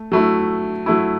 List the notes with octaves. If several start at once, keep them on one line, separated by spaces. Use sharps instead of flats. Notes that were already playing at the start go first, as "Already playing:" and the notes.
Already playing: A3
F#3 A3 E4
F#3 A3 E4